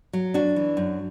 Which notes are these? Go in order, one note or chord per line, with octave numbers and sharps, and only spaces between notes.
F#3
F#2 D4 F#4
E3
F#2